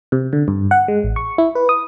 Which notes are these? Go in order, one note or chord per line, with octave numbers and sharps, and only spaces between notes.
C3
D3
G2
F#5
G#3
A1
C#6
E4
B4
D#6